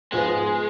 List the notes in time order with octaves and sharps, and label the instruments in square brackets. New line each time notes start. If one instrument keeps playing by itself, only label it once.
[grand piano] G#2 F3 B3 F4 B4 [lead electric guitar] G#3